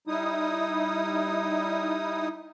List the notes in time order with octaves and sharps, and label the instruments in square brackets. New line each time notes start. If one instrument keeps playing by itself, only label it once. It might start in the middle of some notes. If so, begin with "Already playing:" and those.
[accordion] G3 D#4 E4 D#6